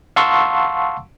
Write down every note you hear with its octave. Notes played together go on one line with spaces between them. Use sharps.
F5 F#5 A5 C6 C#6 E6